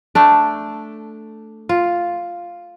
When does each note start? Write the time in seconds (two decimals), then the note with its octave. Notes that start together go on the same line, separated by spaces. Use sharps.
0.15 A3 D4
1.69 F4